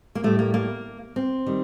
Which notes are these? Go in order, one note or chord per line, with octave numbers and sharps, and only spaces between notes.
A#3
A2 G3 A3
A#3
A#3
C4
D#3 G3